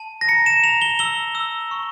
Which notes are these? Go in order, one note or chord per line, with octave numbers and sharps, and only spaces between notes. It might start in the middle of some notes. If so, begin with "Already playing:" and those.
Already playing: A5
A#6
A#5 C#7
E7
A#5 F7
G7
E6 G7
E6
C#6